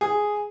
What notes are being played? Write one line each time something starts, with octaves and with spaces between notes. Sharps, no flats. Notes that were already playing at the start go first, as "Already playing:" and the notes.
G#4